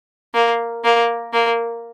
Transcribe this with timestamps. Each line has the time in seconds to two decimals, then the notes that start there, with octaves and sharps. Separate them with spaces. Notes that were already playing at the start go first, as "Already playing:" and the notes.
0.35 A#3
0.84 A#3
1.33 A#3